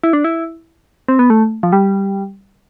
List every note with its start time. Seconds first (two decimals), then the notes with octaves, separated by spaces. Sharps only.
0.04 E4
0.13 D4
0.24 E4
1.08 C4
1.19 B3
1.30 A3
1.63 F3
1.72 G3